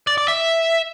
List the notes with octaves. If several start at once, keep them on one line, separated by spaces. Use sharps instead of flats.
D5
D5
E5